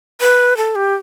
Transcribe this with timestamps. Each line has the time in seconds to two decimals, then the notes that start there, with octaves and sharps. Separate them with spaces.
0.21 B4
0.57 A4
0.75 G4